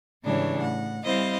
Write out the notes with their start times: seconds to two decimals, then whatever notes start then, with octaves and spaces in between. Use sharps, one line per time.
0.24 G#2 C#3 E3 G3 D4 C#5
0.60 A2 F#5
1.03 G3 C4 E4 C5 D#5 F5